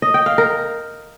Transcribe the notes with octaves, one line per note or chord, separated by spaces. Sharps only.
D#5
G5
F5
A#4